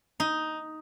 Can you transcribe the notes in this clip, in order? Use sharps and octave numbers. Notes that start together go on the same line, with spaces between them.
D#4